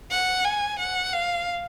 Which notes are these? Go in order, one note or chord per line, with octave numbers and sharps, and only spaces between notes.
F#5
G#5
F#5
F5